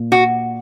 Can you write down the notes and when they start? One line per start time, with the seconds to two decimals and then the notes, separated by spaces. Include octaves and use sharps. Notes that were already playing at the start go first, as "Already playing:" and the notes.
Already playing: A#2
0.12 F#4